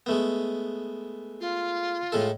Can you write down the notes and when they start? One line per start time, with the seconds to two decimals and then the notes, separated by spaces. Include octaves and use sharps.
0.06 G#3 A3 B3
1.40 F4
2.12 A2 G#3 A4